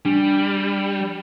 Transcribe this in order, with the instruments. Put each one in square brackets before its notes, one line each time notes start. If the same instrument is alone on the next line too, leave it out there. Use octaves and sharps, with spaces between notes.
[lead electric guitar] G3 [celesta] D4